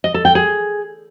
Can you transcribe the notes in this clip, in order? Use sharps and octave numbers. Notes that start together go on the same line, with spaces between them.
D#5
A4
G5
G#4